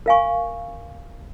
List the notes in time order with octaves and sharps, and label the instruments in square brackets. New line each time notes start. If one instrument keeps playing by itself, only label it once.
[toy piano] A#4 F5 G#5 C#6